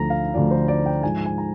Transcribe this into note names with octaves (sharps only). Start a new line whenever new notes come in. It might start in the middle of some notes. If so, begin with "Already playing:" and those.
Already playing: D2 D3 F3 A#5
F5
D2 D3 F3 D5
C5
D5
G5
G#2 F3 G#3 G#5
G#5
A#5